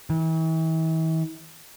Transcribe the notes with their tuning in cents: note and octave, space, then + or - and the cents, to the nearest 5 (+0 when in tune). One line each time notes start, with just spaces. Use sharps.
E3 -40